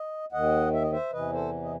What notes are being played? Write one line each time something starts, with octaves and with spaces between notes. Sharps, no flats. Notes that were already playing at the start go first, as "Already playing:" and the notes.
Already playing: D#5
D#2 D#3 D#5 F#5
E5
D#5
C5 E5
E2 C3 E3 B4 D#5
A4 C5
D#5